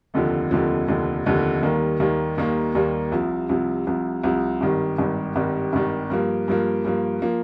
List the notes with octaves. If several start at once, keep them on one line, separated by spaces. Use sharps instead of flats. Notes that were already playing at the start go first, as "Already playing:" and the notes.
F1 D#2 D3 F3
F1 D#2 D3 F3
F1 D#2 D3 F3
F1 D#2 D3 F3
D#2 D#3 G3 A#3
D#2 D#3 G3 A#3
D#2 D#3 G3 A#3
D#2 D#3 G3 A#3
C2 C3 F3
C2 C3 F3
C2 C3 F3
C2 C3 F3
G#1 G2 D#3 G3
G#1 G2 D#3 G3
G#1 G2 D#3 G3
G#1 G2 D#3 G3
G2 F3 A#3
G2 F3 A#3
G2 F3 A#3
F3 A#3